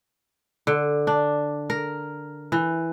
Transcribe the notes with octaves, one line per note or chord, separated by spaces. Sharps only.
D3
D4
A#4
E3